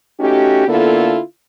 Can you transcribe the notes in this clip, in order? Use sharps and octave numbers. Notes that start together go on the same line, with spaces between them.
A3 C#4 D#4 F#4 G4
D3 A#3 B3 E4 F4 A4